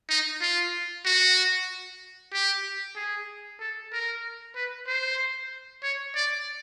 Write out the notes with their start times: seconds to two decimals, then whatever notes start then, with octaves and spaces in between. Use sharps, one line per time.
0.09 D#4
0.41 F4
1.05 F#4
2.33 G4
2.96 G#4
3.60 A4
3.93 A#4
4.56 B4
4.87 C5
5.83 C#5
6.15 D5